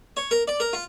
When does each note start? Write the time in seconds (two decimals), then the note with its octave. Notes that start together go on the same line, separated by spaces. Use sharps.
0.17 C#5
0.31 A#4
0.48 D5
0.60 A#4
0.73 F4